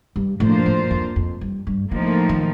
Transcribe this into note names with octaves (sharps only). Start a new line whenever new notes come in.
G2
A2 F3 A#3 D4 F4 C5
A2
F2
F2
G2
G2
A2 D3 F3 A#3 D#4
D#3